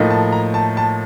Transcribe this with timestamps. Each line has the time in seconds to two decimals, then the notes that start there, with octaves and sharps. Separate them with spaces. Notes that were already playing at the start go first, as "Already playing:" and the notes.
Already playing: A2 F3 A#3 D#4
0.10 A5
0.32 A#5
0.54 A5
0.77 A5